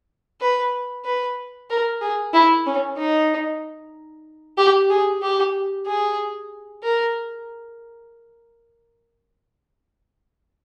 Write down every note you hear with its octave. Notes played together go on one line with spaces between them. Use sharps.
B4
B4
A#4
G#4
E4
C#4
D#4
G4
G#4
G4
G#4
A#4